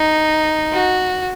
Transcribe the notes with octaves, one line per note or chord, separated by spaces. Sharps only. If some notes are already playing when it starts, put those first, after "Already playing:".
Already playing: D#4
F#4